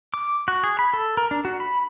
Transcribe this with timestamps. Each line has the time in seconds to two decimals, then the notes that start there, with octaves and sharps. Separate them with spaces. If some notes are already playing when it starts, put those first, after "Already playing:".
0.14 D6
0.48 F#4
0.64 G#4
0.79 B5
0.94 A4
1.17 A#4
1.31 D4
1.45 F#4
1.60 B5